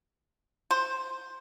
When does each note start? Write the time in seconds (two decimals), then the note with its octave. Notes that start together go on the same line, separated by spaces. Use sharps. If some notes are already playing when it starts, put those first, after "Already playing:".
0.71 C5